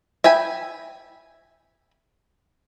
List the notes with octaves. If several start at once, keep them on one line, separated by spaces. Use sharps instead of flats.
E5 G5 G#5 B5